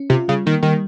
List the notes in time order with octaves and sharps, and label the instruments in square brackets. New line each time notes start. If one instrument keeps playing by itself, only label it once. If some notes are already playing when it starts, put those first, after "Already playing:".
Already playing: [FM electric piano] C#4
[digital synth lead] C3 [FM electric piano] F4
[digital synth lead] C#3 [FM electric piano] G3
[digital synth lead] D#3 [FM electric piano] A#3
[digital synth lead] D#3 [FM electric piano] G3